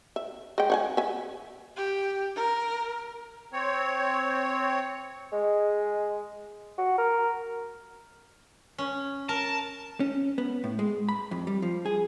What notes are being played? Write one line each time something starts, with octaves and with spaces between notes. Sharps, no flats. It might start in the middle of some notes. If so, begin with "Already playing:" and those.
E5
G#3 G5
C#5 F#5 G#5
E5 G#5
G4
A#4
C4 C#5
G#3
F#4
A#4
C#4
A#4 A5
C#4
B3
A2
G#3
B5
F2
G3
F3
G#4